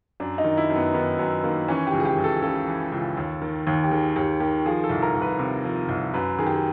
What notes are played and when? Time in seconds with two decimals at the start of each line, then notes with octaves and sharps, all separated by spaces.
0.20 F#2 D4
0.38 D#4
0.44 D#3
0.57 E4
0.70 F#2
0.76 B3
0.94 D#3 B3
1.19 F#2 B3
1.44 D#3 A#3
1.68 E3 C#4
1.87 G4
1.93 C#2
2.00 G#4
2.05 G4
2.18 C#2
2.24 A4
2.42 C#3 A4
2.67 E3
2.92 C#2
3.17 D#2
3.42 D#3
3.67 D#2
3.84 G4
3.91 D#3 G#4
4.16 D#2 G4
4.40 D#3 G4
4.66 F3 G#4
4.84 A4
4.89 C2
5.03 A#4
5.15 C2
5.21 B4
5.39 C3
5.64 F3
5.89 C2
6.14 F#2 B4
6.38 D#3 G#4
6.46 G4
6.54 G#4